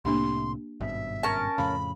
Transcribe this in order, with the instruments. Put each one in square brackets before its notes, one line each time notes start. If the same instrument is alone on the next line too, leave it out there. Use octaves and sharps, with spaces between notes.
[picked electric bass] C2 A2 C3 [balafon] A#3 D4 G4 [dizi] C6
[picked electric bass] G#1 G2 B2 [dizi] E5
[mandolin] C#4 A#4 A5
[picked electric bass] F2 A2 C#3 [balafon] F5 [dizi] B5